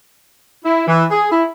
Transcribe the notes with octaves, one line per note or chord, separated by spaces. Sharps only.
E4
E3
G#4
E4